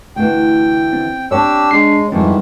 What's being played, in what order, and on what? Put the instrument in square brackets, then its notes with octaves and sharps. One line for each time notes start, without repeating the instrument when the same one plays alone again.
[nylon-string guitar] D2 E3 [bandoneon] G5
[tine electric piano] C4
[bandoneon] D4 G4 E6 [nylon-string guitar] C#5 A5
[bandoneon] G#3 [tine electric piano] D4 C7
[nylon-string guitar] F2 [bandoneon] G#2 D#3 E3 [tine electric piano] G3 C4